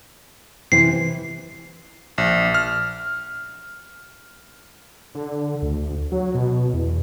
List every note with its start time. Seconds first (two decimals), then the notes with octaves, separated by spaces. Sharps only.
0.72 C3 E3 C7
2.18 A#1
2.54 F6
5.15 D3
5.62 D2
6.12 F#3
6.34 B2
6.74 E2